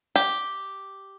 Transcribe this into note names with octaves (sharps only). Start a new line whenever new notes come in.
G4